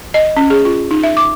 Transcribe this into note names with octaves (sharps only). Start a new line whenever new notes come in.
D#5
C#4
G#4
F4
D#4
E5
D6